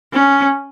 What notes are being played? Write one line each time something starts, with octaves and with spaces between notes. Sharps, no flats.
C#4